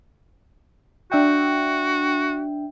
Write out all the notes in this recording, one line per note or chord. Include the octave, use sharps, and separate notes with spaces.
D4 F#4 E5 G5